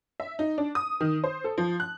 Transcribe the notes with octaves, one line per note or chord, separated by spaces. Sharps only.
E5
D#4
D4
D#6
D#3
C5
A4
F3
F#6